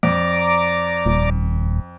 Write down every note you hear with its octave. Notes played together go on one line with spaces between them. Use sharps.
F2 D5 A#5 D6
D#1